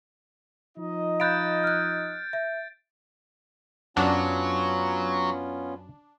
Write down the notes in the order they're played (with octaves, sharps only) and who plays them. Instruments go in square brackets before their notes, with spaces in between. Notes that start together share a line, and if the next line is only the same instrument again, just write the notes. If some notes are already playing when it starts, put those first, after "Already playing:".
[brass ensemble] F3 D#4 D#5
[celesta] F5 B5 F#6 [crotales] G6 A6 D7
[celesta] F6 F#6
E5
[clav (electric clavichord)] F#2 F#5 [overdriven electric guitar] F#3 [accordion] B3 C#4 F4 [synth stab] D4